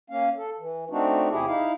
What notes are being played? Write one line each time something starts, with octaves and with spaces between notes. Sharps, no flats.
A#3 C#4 F5
A4
E3
A3 C4 D4 D#4 F#4
E2 C3 E4 G4 G#4
D#4 E4 F5